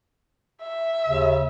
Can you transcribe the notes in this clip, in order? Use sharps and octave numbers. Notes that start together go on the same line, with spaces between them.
E5
D#2 C#3